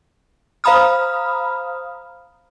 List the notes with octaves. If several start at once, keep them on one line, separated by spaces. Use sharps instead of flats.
C5 F5 A#5 B5 D#6 F6